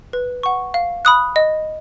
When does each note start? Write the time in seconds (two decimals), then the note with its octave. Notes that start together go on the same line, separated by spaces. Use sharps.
0.13 B4
0.43 F#5 C#6
0.74 F5
1.05 B5 D#6 F#6
1.36 D#5